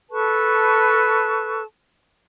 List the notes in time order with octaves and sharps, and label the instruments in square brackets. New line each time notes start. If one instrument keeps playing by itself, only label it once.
[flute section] A4 B4 A5 C#6